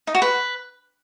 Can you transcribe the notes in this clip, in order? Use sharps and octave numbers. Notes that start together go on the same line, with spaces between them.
D#4
F#4
B4